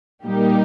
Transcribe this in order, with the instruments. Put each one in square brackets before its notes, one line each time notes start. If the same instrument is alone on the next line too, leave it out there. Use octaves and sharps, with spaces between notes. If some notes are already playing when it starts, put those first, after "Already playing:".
[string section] A#2 G3 A#3 D#4 G4